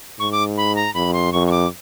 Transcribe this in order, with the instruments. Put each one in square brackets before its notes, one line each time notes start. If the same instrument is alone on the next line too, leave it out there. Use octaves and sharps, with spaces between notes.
[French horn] G#2 [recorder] C#6
[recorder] D6
B5
A#5
[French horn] F2 [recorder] B5
[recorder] C6
[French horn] F2 [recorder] C#6
[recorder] C#6
D6